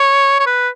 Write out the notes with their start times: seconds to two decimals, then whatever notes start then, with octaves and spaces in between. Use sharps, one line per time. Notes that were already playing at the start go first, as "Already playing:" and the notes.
Already playing: C#5
0.40 C#5
0.47 B4